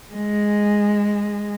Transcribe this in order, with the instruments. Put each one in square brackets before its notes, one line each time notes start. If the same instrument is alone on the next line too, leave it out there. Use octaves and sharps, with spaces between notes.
[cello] G#3